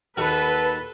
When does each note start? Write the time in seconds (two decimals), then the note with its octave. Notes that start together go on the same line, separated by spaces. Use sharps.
0.17 D#2 F#4 A4 B4